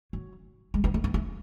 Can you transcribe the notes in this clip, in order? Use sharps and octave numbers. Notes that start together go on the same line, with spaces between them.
F#3
G#3
B3
A3
B3
A3